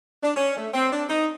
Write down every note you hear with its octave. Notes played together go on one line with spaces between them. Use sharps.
D4
C#4
A3
C4
D4
D#4